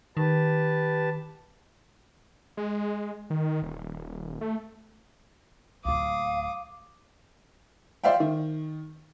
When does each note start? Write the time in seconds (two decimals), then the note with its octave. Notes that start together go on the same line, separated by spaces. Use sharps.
0.17 D#3 G4 B4 A5
2.57 G#3
3.30 D#3
3.62 D#1
4.41 A3
5.85 D1 D2 F5 D6 D#6
8.04 C5 D5 E5 F5 G5
8.20 D#3